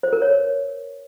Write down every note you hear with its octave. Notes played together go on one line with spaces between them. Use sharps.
C5
A#4
C#5